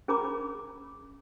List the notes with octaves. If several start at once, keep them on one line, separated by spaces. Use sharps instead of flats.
C#4 G#4 A#4 A#5 B5 D6